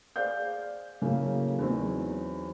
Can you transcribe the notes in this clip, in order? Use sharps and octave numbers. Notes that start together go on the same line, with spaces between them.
G#4 C5 D5 F5 G6
A2 C#3 F#3 A3 A#3
E2 F#3 C4 D#4